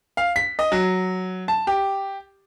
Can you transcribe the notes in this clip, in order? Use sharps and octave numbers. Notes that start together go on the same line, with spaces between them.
F5
B6
D#5
F#3
A5
G4